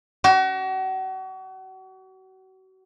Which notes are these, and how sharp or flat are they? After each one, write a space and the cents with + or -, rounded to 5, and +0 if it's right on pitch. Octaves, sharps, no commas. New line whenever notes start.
F#4 +35